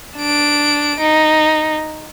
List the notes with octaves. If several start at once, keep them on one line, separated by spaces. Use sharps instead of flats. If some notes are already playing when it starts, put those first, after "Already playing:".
D4 D7
D#4